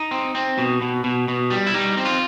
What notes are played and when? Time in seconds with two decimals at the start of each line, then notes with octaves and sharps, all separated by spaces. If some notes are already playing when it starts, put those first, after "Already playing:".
Already playing: D#4
0.11 C4
0.35 C4
0.58 B2
0.82 B2
1.04 B2
1.28 B2
1.50 G3
1.67 E4
1.74 G3 D#4
1.97 C4
2.05 F4